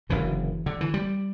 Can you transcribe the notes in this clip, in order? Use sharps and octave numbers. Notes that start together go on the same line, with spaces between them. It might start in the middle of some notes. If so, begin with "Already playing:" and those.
F#1 F#2 D3 E3
D3
E3
G3